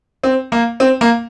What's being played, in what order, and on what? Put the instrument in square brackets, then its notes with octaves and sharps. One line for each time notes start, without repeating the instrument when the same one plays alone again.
[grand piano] C4
A#3
C4
A#3